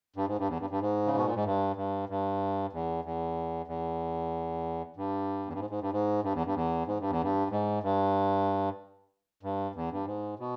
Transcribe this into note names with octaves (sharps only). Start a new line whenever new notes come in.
G2
G#2
G2
E2
G2
G2
G#2
C#3
B2
A#2
G#2
G2
G2
G2
E2
E2
E2
G2
E2
G2
G#2
G#2
G2
G#2
G2
E2
G2
E2
G#2
G2
E2
G2
G#2
G2
G2
E2
G2
G#2
B2